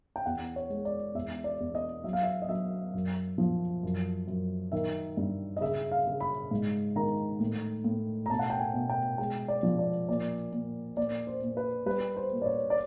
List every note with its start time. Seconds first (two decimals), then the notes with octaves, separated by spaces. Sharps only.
0.16 G5
0.26 E2 F#5
0.56 C#5
0.70 G#3
0.85 D5
1.15 E2 E5
1.44 D5
1.60 E2
1.75 D#5
2.04 F#3 E5
2.13 F5
2.23 E5
2.42 D#5
2.49 F#3 E5
2.94 F#2
3.38 F3
3.83 F#2
4.27 F#2
4.72 D#3 E5
5.17 G2
5.57 D#5
5.61 C#3 E5
5.91 F5
6.07 C#3
6.20 B5
6.51 G#2
6.96 D#3 A#5
7.40 A2
7.84 A2
8.26 A#5
8.30 B2 A5
8.39 F#5
8.50 G5
8.60 G#5
8.74 B2
8.90 G5
9.18 G#3 G5
9.48 D5
9.63 F3
9.79 D5
10.09 A#2 D5
10.52 A#2
10.97 A#2 D5
11.27 C5
11.42 A#2
11.57 B4
11.86 G3 B4
12.16 C5
12.32 A#2
12.42 D5
12.46 C#5
12.70 D5